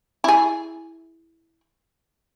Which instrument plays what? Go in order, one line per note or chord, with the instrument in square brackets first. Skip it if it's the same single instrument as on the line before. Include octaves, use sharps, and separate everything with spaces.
[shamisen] E4 G#4